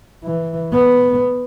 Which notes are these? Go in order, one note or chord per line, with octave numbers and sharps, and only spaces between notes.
E3
B3